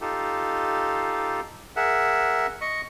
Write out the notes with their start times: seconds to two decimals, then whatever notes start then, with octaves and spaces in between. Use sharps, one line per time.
0.01 D#4 F4 G4 A4
1.76 G#4 A#4 E5 F#5
2.61 D#5 C#6